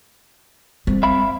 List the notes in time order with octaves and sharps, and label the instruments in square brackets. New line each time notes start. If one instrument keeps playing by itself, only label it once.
[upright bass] G3 C4
[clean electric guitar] E5 F5 B5